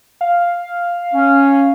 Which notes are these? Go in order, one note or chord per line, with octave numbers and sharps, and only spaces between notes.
F5
C#4